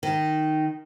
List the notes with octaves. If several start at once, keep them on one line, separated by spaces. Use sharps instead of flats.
D#3